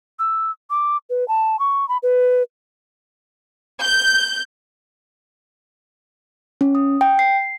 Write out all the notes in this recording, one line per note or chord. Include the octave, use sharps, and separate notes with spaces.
E6
D6
B4
A5
C#6
B5
B4
G6
C#4
D#6
G5
C7